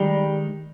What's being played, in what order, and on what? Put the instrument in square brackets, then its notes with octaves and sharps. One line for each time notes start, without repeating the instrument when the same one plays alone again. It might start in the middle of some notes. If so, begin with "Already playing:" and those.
Already playing: [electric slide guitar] D#3 G#3 D#4 [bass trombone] G3